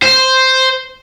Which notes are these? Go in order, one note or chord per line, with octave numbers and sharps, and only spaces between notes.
C5